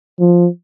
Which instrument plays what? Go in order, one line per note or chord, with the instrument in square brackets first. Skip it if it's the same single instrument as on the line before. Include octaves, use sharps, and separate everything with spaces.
[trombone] F3